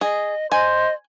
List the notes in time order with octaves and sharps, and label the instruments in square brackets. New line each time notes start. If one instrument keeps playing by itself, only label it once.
[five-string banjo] G#4 [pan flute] D#5
[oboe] C5 [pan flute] D#5 [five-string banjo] G#5